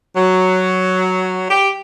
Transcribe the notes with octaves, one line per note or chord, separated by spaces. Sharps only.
F#3
G4